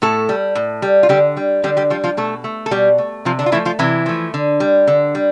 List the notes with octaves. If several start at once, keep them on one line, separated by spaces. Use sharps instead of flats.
A2 A3 A4
G3
A2
G3
F4
D3 G3 G4
G3
D3 G3 G4
G3 G4
F3 G3 F4
F3 F4
B2 A3 A4
A3
A4
B2 G3 G4
A3
C3 F3 F4
D3 D4
F4
E3 F3 A3 E4
F3 F4
C3 E3 E4
F3 A3
D3
G3
D3
G3